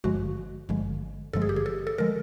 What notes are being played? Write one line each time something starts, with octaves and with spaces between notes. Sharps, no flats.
G#1 G2 D3 F3 G#3 F#4
G#1 G2 D3 F3 G#3
G#1 G2 D3 F3 G#3 A4
G#4
G4
G#4
A4
A4
D3 F3 G#3 A#4